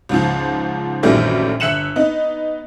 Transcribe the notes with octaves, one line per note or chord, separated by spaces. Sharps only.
C#2 G#2 F3
A#1 F#2 D#3 E3 G3 A3
G1 E5 F#6 C#7 E7 F#7
B3 D#4